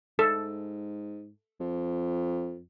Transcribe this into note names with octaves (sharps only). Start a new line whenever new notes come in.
G#2 A4
F2